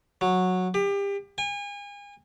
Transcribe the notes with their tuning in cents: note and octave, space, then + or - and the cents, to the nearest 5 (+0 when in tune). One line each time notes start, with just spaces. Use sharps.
F#3 -10
G4 +30
G#5 -35